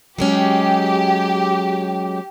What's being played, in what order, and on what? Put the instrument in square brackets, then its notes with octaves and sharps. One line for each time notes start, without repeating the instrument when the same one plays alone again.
[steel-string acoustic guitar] F#3 G#3 C#4 [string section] G4